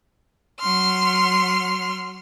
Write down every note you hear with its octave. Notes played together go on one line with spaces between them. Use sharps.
F#3 C6 F6